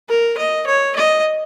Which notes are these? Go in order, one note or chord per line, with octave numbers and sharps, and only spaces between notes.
A#4
D#5
C#5
D#5